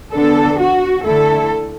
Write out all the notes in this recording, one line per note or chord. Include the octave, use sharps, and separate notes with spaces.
D3 B3 D4 A4
F#4
D3 A3 E4 A4